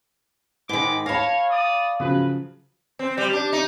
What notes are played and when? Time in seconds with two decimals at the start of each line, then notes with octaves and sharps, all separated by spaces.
0.69 G#2 D#3 G#3 B5 D6
1.06 C#5 F5 A5 B5 A#6
1.50 D5 D#6
2.00 C#3 F3 F#3 B4
2.99 C4
3.17 G3
3.33 D4
3.53 D#4